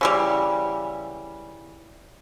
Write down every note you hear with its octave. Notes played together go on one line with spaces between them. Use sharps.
C#3 E3 G3